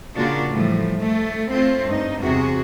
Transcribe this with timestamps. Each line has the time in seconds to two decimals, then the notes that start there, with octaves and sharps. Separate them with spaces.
0.15 A#2 C#3 A#3 D4 F4 F#4
0.50 A2 E3 F3 G3 A3
0.96 A3
1.50 A3 C4 F4
1.84 G2 D#4
2.20 E2 C3 F#4 G#4